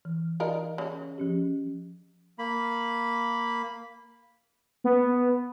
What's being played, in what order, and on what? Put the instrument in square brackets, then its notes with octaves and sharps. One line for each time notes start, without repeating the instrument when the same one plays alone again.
[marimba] E3
[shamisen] D#4 F4 A#4 [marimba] D5 F5
[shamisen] C#3
[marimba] F3 C#4 G4
[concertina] A#3 B5
[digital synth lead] B3